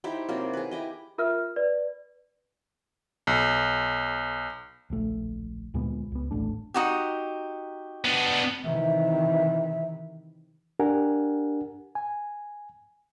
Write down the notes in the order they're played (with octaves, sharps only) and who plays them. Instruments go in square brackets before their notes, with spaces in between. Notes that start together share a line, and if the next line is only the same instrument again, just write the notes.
[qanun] D#4 E4 G4 C5
C3 F#3 A#3
G#4 B4
E4 G4 D#5
[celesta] F4 A#4 E5 F6
B4 D5
[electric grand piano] B1
[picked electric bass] D1 A#1 A3
D2 A#2 G#3 B3
C#2 B3
D#1 A1 A3 D4
[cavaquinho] D#4 F#4 G4
[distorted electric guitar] B3 D4
[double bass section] C3 D#3 E3 [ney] E5
[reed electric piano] D4 G4 A#4 F#5 G#5
G#5